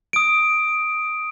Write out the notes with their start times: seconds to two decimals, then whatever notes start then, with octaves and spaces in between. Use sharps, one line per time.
0.13 D#6 D7